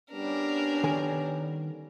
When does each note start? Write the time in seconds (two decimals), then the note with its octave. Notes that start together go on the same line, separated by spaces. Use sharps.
0.11 G3 B3 C#4 D4 A#4
0.84 D#3 A4 G#5